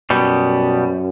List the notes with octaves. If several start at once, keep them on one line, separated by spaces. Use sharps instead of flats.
F#2 B2 G3 B3